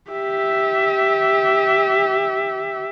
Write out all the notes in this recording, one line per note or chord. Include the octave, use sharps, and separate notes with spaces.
G4 E5